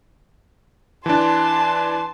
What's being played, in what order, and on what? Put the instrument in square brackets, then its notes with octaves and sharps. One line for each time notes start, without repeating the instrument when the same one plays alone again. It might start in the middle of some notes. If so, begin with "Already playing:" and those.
[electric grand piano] E3 D4 [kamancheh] A5 C6